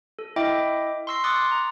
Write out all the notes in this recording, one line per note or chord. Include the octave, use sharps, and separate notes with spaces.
A4
E4 D#5 E5 G5 D6
C6 C#6 E6 A#6 C7
C6 D6 D#6 F#6 A6 C#7
A#5